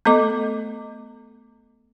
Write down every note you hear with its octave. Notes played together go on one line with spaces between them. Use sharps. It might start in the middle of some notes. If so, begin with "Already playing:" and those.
A3 B3 A4 D#5 D6